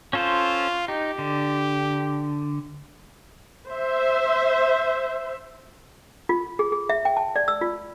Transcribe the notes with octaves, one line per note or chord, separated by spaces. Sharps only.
C#4 F4 A4 C5
D#4 G4
D3
C5 E5
F4
G#4
G#4
E5
G5
A5
D5
E6
F4